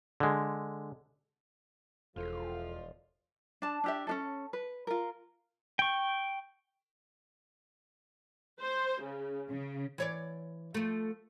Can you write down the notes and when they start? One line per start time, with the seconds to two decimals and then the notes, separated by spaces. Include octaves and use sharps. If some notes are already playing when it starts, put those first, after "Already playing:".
0.20 D3 G#3
2.16 E1 E2 F3 F4 A4
3.62 D4 A5
3.84 D4 G4 E5
4.07 C#4 D4 A4
4.53 B4
4.87 F4 A#4
5.79 G5 C#6
8.60 C5
9.02 C#3
9.49 C#3
9.98 E3 C#5 D5
10.74 F3 A3